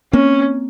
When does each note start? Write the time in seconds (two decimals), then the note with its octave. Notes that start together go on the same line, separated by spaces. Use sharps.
0.13 A#3 C4 C#4